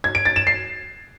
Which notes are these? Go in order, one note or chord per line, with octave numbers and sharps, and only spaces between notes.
G#6
D7
A6
E7
C7